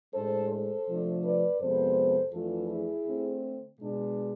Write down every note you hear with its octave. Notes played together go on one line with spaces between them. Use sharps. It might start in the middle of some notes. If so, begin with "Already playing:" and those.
A2 G#3 D4 A4 C5
A4 C5
C3 F3 A3 D4
B4 D5
F2 C3 G#3 B3 D4 A4 C5
F2 E3 A3 D4 F4 A4
E4 G#4
D3 A3 C4
B2 G#3 D4